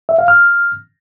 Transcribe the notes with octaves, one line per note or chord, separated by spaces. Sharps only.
E5
F5
F6